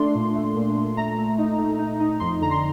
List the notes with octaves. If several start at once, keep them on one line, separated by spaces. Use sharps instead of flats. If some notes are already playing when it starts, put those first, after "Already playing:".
Already playing: A3 D4 C6
A#2
A3
A#2
A#2
A3 A#5
A3
D#4
A3
D#4
D#4
F2 C6
D3 A#5
C6